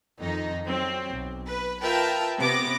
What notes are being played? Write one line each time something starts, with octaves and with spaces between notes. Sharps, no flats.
F2 D#3 D#4
F#3 C4
B1
B4
F4 A#4 B4 E5 G5 A5
C3 B3 D6 A#6